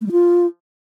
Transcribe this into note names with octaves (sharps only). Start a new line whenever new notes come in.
A3
G3
F4